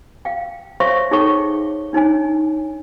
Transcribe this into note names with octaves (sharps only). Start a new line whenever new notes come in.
F5 G5
C5 C#5 E5 F5 C6 C#6
D#4 G#4 A4 C#5 G5 C#6
D4 D#4 C#5 G#5